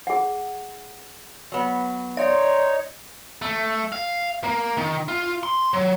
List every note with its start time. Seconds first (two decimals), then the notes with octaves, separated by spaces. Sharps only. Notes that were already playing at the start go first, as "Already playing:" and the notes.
0.07 G#4 F#5
1.52 F#3 B3
2.17 D#4 C#5 D5 E5 C6
3.42 A3
3.92 F5
4.44 A#3
4.77 D#3
5.08 F4
5.43 C6
5.74 F#3